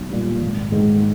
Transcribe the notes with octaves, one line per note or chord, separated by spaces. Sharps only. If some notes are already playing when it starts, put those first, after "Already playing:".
Already playing: B1
A#2 G3
G#1
G#2 D#3